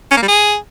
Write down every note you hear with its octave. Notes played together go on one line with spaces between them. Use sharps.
C#4
A#3
G3
G#4